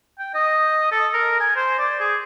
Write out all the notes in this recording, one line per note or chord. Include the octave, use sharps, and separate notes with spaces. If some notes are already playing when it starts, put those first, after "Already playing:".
G5
D#5
A4
A#4
G#5
C5
D5
G#4